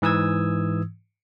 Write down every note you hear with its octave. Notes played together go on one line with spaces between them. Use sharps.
G#2 E3 D#6 E6 G#6